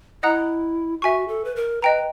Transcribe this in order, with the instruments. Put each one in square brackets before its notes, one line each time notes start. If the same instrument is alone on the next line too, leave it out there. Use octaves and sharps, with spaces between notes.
[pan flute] E4 [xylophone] D#5 F#5 A#5 D#6 F#6
[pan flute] F#4 [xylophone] E5 G#5 C#6
[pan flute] A4
B4
A#4
[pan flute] B4 [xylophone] D#5 G5 A#5